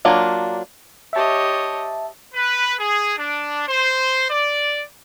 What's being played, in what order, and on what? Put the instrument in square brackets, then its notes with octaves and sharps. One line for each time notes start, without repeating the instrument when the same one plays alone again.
[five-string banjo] F#3 A#3 D4 F4
[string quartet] G4 C#5 D#5 [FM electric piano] E5 A5
[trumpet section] B4
G#4
D4
C5
D5